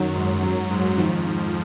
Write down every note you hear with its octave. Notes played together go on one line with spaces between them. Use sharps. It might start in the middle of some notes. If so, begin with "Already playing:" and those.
Already playing: F#2 D#3 F#3
G#2
F#3
G#2
F2 D#3 F3
G#2